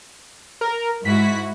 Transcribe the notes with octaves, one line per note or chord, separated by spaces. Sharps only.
A#4
G#2 E4 F#4 B6